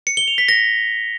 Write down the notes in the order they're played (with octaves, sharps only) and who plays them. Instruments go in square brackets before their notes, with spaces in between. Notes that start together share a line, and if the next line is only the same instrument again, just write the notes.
[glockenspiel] C#7
G7
F7
B6
A#6